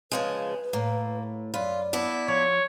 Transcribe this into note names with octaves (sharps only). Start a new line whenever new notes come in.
C#3 F3 G#3 B4
A2 A#3 F5
F#2 F4 B4 D5
B3 D4 E4
F3 C#5